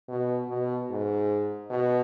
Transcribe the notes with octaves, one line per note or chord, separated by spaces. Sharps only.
B2
B2
G#2
B2